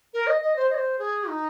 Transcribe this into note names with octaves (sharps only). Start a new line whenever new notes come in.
A#4
D#5
D#5
C5
D#5
C5
G#4
D#4